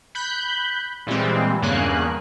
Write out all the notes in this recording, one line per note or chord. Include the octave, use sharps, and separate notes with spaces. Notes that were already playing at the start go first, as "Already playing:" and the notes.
B5 F#6 G6
A#2 E3 G3 G#3 C4
E2 G2 C#3 A#3 G#5 F#6